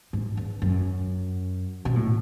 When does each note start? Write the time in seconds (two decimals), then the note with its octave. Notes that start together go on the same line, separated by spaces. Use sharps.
0.13 G#2
0.37 E2
0.62 F#2
1.85 B2
1.96 A2